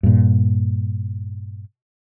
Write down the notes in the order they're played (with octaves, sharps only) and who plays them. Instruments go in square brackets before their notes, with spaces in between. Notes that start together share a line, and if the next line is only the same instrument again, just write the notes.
[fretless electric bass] G2 A#2